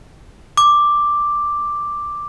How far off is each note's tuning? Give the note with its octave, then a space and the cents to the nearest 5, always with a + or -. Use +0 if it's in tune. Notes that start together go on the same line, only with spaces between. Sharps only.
D6 +5